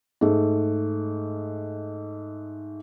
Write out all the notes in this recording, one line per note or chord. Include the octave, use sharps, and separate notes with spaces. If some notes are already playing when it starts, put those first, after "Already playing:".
G#2 A3